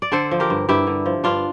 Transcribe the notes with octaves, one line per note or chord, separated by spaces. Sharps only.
D5
D3 A4 C5
F3
G4 A#4
G2
G2 E4 G4
D3
F3
G2 D4 F4